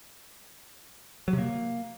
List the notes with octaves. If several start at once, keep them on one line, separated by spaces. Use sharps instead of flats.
F#3
C3
A#3